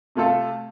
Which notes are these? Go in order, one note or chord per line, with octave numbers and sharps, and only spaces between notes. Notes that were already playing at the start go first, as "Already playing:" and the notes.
C3 A3 F4 A4